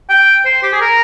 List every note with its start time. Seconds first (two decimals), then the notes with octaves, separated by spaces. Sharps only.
0.09 G5
0.46 C5
0.63 G4
0.73 G#4
0.81 A#4